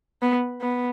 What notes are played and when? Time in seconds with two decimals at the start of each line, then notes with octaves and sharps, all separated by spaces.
0.22 B3
0.62 B3